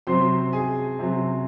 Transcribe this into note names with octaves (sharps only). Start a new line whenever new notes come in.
C3 F#3 C4 C5 C6
G#4 G#5
C3 F#3 C4